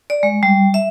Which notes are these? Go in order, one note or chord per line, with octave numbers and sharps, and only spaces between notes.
D5
G#3
G3
E5